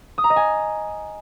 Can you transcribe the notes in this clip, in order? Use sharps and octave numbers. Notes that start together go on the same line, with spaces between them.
D#6
A#5
D#5
G#5